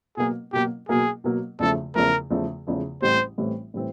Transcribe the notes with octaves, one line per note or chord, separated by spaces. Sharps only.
B2 F#3 A#3 G#4
B2 F#3 A#3 G4
B2 F#3 A#3 G#4
B2 F#3 A#3
E2 C#3 F3 A3 A4
E2 C#3 F3 A3 A#4
E2 C#3 F3 A3
E2 C#3 F3 A3
A1 A2 E3 G3 C4 C5
A1 A2 E3 G3 C4
A2 E3 G3 C4